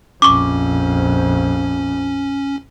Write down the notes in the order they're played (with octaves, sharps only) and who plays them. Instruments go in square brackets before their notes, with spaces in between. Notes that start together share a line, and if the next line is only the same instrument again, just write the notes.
[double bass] A#1 F2 [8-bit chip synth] C#4 [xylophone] C#6 D6